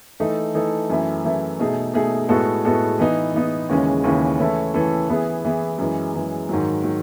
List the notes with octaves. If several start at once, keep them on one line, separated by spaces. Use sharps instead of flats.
E3 A3 D#4 A4
E3 A3 D#4 A4
F#2 E3 A3 E4
F#2 E3 A3 E4
B2 A3 D#4 G#4
B2 A3 D#4 G#4
A2 G#3 B3 F#4 A4
A2 G#3 B3 F#4 A4
E3 B3 D#4
E3 B3 D#4
D#2 C#3 E3 G#3 C#4
D#2 C#3 E3 G#3 C#4
E3 A3 C#4 E4 A4
E3 A3 C#4 E4 A4
E3 B3 E4 G#4
E3 B3 E4 G#4
F#2 E3 G#3
F#2 E3 G#3
G#2 D#3 F#3
D#3 F#3